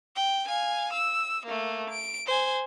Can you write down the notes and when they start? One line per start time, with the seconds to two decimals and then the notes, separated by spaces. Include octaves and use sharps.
0.16 G5
0.48 F5 G#5
0.93 E6
1.46 A3 A#3
1.90 D7
2.26 C5 G#5